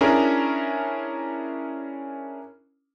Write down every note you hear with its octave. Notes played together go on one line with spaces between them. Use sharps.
C#4 D4 E4 G#4 A#4